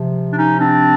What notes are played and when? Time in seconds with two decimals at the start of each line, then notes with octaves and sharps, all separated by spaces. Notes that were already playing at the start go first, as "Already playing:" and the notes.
Already playing: C3 F3
0.32 D4
0.37 C#4 D#4
0.59 C4 D4